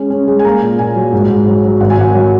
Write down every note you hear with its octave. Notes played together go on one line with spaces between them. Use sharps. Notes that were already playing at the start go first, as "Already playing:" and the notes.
Already playing: G#3 C#4
C#4
G#3
G#5
A#3 A#5
A#2
A#2 G#5
F#3
G#2
G#2
F#3
F#3
G#1 F#5
G#5
G#1 F#5
F#3